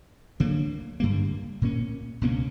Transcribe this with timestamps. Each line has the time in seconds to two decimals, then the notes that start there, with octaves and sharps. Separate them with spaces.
0.40 D2 D3 F#3 A#3
1.00 G2 D3 G3 A#3
1.62 A#2 A#3 C#4
2.21 C#2 B2 A#3 C#4